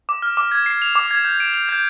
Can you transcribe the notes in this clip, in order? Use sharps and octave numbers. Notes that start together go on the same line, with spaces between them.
D6
F6
D6
G#6
C7
F7
D6
G#6
G6
D7
F7
G6